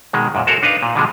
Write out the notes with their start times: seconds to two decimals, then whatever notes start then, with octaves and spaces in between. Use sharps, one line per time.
0.13 B2 D#3 G#3
0.35 F#2 A#2
0.47 F#4 A4 A#4 C5 C#5 F#5
0.63 D4 D#4 B4 F5
0.83 A#2
0.95 B2 D3 F3 G3 G#3